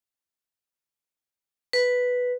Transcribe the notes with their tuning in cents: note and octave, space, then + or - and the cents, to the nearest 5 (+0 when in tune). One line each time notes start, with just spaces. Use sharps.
B4 +0